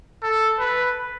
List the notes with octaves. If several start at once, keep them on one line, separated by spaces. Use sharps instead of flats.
A4
B4